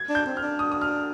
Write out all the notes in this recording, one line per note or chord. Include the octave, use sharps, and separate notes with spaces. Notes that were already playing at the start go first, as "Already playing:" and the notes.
Already playing: G#6
D4
G6
C4
F6
D4
D#6
D#6
F6